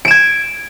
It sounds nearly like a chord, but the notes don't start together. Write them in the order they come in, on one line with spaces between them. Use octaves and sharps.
D7 E7 G#6